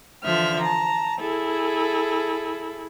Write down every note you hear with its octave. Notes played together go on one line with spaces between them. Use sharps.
D3 E3 F3 E5 F6
A5 A#5
E4 G#4 A4